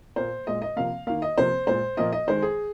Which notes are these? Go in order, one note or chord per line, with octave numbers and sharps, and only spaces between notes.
A#2 A#3 C5
A#2 G#3 D#5
D#5
C3 F3 A#3 F5
D#3 A#3 F5
D#5
C3 F3 A#3 C5
A#2 G#3 C5
A#2 F3 A#3 D#5
D#5
D#3 G#3 C5
G#4